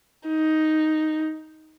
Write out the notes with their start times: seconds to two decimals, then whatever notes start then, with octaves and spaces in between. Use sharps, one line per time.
0.28 D#4